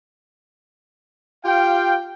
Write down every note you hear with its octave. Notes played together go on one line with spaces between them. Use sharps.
F4 G4 F5 G5